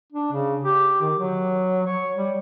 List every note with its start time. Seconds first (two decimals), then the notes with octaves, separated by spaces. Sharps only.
0.12 D4
0.32 C#3
0.63 G4
1.02 D#3
1.16 F#3
1.87 C#5
2.16 G3